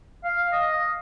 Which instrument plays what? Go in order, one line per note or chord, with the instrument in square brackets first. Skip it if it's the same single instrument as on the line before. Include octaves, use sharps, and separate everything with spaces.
[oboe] F5
D#5